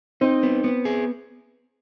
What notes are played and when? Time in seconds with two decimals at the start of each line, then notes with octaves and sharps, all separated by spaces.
0.21 C4 D#4
0.43 B3
0.64 B3
0.85 G#4